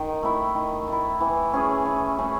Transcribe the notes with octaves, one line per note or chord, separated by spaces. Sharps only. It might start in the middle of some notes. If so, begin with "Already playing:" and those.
Already playing: D#3
A3 E4
D#3
A3 E4
E3
A3 C#4 G#4
E3
A3 C#4 G#4